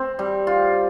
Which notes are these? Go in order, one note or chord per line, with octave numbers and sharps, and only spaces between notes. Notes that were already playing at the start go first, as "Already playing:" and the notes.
Already playing: C4
G3
F4